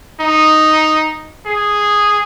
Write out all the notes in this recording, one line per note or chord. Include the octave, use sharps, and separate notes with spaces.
D#4
G#4